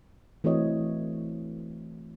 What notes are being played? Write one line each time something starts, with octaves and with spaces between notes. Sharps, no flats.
E3 A3 C4 F#4 C#5 D#5